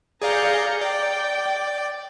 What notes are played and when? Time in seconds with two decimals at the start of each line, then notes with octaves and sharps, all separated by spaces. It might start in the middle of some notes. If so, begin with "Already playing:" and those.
0.22 G#4 D5 F5 A#5 G6 C#7
0.81 D5 G5